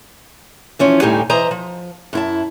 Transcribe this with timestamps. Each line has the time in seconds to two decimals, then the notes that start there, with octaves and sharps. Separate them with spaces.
0.79 E3 F3 C#4
1.01 D2 A2 G3 D#4 G4 G#5
1.30 E3 C5 D#5 E5 A#5
1.51 F3
2.13 F#2 E4 A5